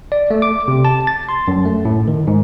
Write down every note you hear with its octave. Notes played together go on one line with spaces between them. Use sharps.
D5
A3
D6
C3
A5
A6
C6
F#2
A3
A2
D#3
G#2